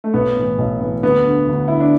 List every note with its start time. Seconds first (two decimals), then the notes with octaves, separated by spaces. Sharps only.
0.04 A3
0.14 B1 B3
0.36 A2 E3
0.58 B1
0.80 A2 E3
1.03 D2 B3
1.25 D3
1.48 D2
1.68 D3 E4
1.80 D4